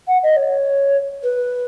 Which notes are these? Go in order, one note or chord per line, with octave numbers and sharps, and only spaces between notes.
F#5
D#5
C#5
B4